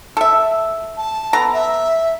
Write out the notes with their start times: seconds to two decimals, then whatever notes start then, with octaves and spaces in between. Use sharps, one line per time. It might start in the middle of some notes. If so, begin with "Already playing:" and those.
0.17 A4 E5
0.97 A5
1.33 B3 A4 A#5
1.53 E5